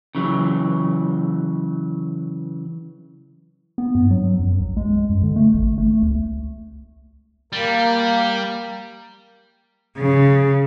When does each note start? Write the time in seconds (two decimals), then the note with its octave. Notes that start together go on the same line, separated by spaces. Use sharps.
0.15 C#3 E3 F#3
3.78 B3
3.95 G2
4.11 F#3
4.40 F#2
4.60 B1
4.77 G#3
5.09 F#2
5.23 D3
5.36 A3
5.54 A1
5.78 A3
6.03 C#2
7.53 G3 A#3
9.99 C#3